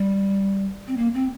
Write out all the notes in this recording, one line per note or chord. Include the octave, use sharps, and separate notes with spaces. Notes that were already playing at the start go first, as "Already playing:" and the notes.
Already playing: G3
C4
A#3
C4